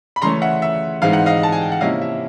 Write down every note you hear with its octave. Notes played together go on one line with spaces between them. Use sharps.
B5
C#3 E3 A3 C#4 A#5 C6
E5 F#5
E5
G#2 E3 G#3 C4 D#4 F5
F#5
D#5 F5
A5
G#5
G5
F#5
C3 F3 A#3 C#4 E4 D#5 F5
E5